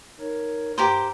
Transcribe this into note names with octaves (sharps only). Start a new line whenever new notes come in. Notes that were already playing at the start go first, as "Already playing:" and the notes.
D#4 A#4 C#5
G2 G4 A#4 C5